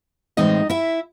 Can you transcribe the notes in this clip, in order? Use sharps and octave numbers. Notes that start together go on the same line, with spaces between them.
A2 E3 G#3 C4 D#4 D#5
E4 E5